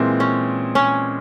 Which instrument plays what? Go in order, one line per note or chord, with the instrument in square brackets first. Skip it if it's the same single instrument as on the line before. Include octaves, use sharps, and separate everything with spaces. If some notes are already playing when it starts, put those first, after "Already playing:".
Already playing: [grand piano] A#2 G#3 C4 [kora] E3
[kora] C#4
C#4